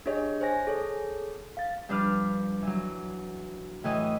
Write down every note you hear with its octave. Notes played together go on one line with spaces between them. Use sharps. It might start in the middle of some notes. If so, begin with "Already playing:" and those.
D4 G4 G#4 C#5 D#5
C5 C#5 G#5 A#6
G#4 A4 C#5
F5 A6
G2 F3 D4 B4 D6 F6
E3 F#3
A2 E3 D#5